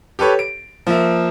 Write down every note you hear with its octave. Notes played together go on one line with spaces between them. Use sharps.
G4 A4 B4 C#5
D7
F3 A#3 E5